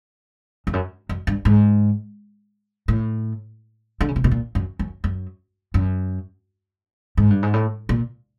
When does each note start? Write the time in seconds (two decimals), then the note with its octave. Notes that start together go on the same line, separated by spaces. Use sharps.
0.67 F2
0.73 F#2
1.09 F#2
1.27 G2
1.45 G#2
2.88 A2
4.01 D3
4.08 C#3
4.16 C3
4.24 B2
4.31 A#2
4.55 F#2
4.79 F#2
5.04 F#2
5.74 F#2
7.17 G#2
7.30 G2
7.43 G#2
7.53 A2
7.89 A#2